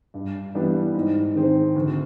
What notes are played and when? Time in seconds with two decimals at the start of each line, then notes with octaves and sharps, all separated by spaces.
0.14 G2
0.55 E3 G3 B3 D4
0.94 G#2
1.35 D#3 G#3 C4
1.76 D2